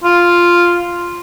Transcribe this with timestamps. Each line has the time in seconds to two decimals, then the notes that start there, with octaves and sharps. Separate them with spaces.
0.04 F4